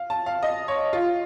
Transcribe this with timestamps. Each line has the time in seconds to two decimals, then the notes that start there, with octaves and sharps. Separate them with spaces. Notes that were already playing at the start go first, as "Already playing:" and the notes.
Already playing: F5
0.10 A5
0.26 F5
0.43 D#5
0.68 C#5
0.93 F4